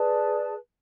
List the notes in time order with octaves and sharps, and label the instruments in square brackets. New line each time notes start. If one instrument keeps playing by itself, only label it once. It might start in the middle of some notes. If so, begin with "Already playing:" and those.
Already playing: [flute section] G#4 B4 D5 A5